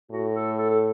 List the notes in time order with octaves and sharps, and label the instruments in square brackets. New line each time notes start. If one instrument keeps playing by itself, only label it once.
[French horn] A2 [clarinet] F#4
[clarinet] A4
A4
A4